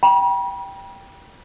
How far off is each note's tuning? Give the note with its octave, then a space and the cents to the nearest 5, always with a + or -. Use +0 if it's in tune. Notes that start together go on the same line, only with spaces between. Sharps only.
G5 +0 B5 -40